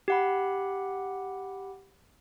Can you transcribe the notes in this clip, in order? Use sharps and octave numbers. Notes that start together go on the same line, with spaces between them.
G4 F#5 B5